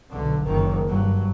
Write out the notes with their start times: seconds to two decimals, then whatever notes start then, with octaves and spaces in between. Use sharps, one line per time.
0.10 B1 D3
0.43 F#1 D#3
0.88 G2 F#3